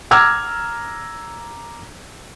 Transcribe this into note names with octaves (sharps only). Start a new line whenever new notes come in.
A#5 D6 E6 F6 G#6